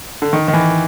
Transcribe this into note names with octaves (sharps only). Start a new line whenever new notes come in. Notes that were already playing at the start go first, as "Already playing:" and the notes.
D3
D#3
D#3
E3